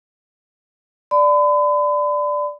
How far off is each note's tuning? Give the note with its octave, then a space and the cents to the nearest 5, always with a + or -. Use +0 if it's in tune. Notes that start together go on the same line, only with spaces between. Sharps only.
D5 +0 B5 +40